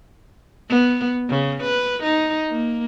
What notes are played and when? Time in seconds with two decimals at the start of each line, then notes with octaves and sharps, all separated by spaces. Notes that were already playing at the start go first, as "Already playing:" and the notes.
0.69 B3
1.30 C#3
1.63 B4
2.03 D#4
2.51 A#3